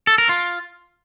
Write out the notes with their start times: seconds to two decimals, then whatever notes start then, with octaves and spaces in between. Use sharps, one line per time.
0.07 A4
0.18 A#4
0.29 F4